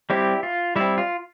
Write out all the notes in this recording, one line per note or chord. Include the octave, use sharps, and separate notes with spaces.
G3 C4 E4 G4
F4
G3 C4 E4
F4